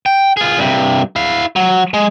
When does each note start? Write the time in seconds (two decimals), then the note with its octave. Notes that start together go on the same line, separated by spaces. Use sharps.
0.06 G5
0.37 F4 G#4
0.58 G2 C3
1.16 E4 F5
1.56 F#3
1.94 G#3